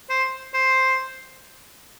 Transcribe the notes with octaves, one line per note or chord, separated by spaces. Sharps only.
C5
C5